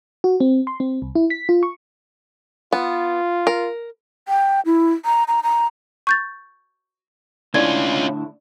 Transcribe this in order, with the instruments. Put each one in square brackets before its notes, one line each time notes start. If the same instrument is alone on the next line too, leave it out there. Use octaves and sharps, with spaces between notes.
[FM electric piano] F#4
C4
C6
C4
C2
E4
B6
F4
C#6
[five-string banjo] B3 [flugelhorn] F4
[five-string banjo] A#4
[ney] G5
E4
A#5
A#5
A#5
[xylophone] C#6 G6 A6
[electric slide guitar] A2 D3 E4 [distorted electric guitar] C#4 F4 [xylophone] D5 G#6